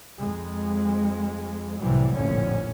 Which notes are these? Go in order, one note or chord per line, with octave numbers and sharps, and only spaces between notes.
F2 G#3
C2 A2 C3 E3 F#3 G3
F1 A#1 F2 A2 D3 C#4